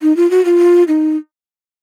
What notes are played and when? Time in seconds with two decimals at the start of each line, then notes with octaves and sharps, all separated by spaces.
0.02 D#4
0.17 F4
0.31 F#4
0.45 F4
0.88 D#4